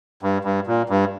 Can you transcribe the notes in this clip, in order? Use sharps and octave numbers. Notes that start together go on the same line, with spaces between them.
G2
G2
A#2
G2